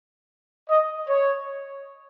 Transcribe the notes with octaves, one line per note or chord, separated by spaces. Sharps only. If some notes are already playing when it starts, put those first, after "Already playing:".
D#5
C#5